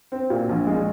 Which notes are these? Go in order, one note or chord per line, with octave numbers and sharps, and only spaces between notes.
C4
A#2
A#1
G#3